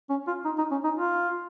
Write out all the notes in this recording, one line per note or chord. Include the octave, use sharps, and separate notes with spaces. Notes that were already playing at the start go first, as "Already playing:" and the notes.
C#4
F4
D#4
D#4
C#4
D#4
F4